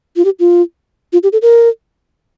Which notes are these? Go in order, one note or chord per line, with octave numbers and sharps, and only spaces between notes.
F4
G4
F4
F4
G4
A4
A#4